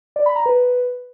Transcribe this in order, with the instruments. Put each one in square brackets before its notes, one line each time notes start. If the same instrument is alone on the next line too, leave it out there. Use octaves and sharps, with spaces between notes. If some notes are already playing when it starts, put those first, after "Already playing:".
[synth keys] D5
B5
A#5
B4